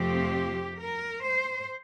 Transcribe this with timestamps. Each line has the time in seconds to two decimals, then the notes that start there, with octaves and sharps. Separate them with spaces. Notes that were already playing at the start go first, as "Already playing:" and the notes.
Already playing: F2 C3 F3 A3 C4 G4
0.78 A#4
1.24 C5